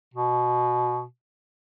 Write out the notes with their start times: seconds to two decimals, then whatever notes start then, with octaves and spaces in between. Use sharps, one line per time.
0.14 B2